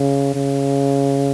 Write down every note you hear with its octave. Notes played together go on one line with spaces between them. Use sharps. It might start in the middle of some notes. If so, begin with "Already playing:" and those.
Already playing: C#3
C#3